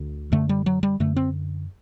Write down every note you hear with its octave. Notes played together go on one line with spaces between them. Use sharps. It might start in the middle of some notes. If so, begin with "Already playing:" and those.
Already playing: D2 D3
F#2 D3 A3
G3
F#3
G3
F#2 D3 A3
C4